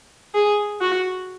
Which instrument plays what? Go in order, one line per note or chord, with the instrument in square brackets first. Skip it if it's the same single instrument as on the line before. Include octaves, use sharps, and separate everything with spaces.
[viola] G#4
F#4